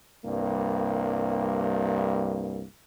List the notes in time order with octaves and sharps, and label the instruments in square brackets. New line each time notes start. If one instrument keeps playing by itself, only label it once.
[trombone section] C2 G2 A#3